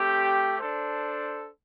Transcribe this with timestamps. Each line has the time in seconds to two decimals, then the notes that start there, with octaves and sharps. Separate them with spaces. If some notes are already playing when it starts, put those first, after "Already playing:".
Already playing: A3 C4 G4
0.58 D4 A4 C5